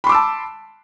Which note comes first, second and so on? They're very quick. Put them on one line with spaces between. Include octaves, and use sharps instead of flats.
B5 C6 D6 E6 A5